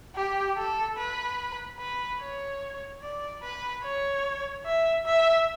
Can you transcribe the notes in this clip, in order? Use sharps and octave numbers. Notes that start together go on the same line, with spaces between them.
G4
A4
B4
B4
C#5
D5
B4
C#5
E5
E5